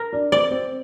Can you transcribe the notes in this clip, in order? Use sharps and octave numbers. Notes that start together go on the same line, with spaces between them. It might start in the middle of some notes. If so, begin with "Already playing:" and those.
Already playing: A#4
D4
C4 D5
C4